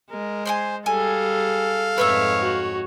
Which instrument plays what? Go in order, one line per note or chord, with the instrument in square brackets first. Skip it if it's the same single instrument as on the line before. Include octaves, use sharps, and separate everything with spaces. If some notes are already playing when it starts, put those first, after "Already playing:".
[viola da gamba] G#3 [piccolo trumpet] A#4
[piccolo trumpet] C5 [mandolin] G#5 B5 C6
[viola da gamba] G3 G#4 [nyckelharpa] A4 [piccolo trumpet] F5 [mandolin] G#5
[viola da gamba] F2 G#2 C#5 [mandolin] B4 E5 E6
[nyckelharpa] F#4